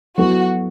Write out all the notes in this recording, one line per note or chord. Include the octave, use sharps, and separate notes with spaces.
F#3 B3 E4 F#4 A4